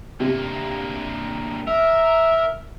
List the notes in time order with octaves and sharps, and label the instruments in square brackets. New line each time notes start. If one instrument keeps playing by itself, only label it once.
[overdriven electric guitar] G2 A#3 [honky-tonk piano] C3
[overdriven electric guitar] A#4 [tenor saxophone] E5